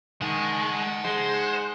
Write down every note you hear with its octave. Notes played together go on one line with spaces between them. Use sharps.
D#3 G#3 F#5 A5
G#3 C5